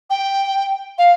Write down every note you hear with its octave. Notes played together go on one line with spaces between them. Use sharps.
G5
F5